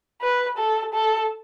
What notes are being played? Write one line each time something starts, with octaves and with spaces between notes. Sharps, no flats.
B4
A4
A4